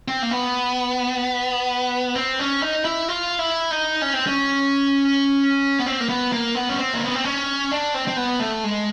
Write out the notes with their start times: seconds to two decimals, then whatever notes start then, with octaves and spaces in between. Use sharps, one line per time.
0.08 C4
0.22 A#3
0.31 B3
2.16 C4
2.39 C#4
2.62 D#4
2.85 E4
3.08 F4
3.39 E4
3.71 D#4
4.02 C#4
4.13 C4
4.27 C#4
5.79 B3
5.86 C4
6.00 A#3
6.09 B3
6.32 A#3
6.55 B3
6.69 C#4
6.79 C4
6.94 A#3
7.04 B3
7.15 C4
7.24 C#4
7.71 D4
7.94 C4
8.08 C4
8.17 B3
8.40 A3
8.64 G#3